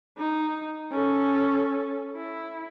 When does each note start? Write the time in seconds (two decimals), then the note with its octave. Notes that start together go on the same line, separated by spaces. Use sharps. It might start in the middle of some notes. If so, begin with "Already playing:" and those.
0.18 D#4
0.92 C#4 A4
2.16 E4